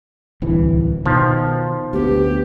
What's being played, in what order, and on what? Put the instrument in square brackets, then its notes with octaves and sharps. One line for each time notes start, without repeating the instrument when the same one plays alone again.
[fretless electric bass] D1 C2 E3
[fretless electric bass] B2 D#3 [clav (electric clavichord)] F3
[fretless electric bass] D2 B3 [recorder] G4